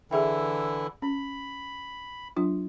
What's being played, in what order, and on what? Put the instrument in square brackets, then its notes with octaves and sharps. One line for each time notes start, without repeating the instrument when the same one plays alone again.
[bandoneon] D3 E3 E4 [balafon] G#4 E5 G5
[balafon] C#4 [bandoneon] B5
[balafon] F#3 D4 F4